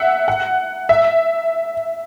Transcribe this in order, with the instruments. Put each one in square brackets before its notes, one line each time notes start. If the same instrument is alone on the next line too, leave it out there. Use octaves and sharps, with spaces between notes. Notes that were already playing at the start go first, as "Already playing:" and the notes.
Already playing: [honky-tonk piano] E5 F#5
F#5
E5